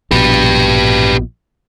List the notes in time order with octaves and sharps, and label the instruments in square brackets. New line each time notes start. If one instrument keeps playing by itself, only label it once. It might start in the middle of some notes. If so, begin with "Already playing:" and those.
[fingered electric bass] A#1 B2 [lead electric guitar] G4 B4